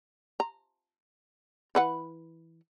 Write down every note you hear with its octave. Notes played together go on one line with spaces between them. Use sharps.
A#5
E3 B4 F#5